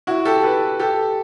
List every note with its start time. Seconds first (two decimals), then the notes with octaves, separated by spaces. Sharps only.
0.07 E4 F#4
0.25 G4 A4
0.44 A4 B4
0.79 G4 A4